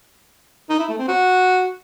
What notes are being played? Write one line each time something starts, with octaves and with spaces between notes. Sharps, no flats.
D#4
E4
A3
C4
F#4